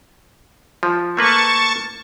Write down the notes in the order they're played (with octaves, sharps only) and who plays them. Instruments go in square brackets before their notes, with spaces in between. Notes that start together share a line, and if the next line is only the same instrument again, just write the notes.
[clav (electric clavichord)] F3
[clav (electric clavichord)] A3 A#3 B4 [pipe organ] A5 C#6